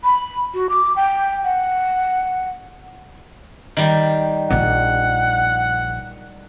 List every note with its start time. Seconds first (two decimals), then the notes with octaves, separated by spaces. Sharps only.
0.04 B5
0.54 F#4
0.70 D6
0.96 G5
1.44 F#5
3.77 D#3 G3
4.50 A#1 A#3 F#5